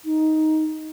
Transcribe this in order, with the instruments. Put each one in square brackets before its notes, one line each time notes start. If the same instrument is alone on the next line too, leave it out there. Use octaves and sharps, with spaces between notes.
[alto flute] D#4